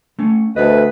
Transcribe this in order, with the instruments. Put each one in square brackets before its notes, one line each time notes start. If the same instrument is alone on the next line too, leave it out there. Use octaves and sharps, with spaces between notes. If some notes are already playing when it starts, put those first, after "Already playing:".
[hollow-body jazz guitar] A3 C#4
[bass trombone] D2 [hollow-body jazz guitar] A4 D#5 [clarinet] B4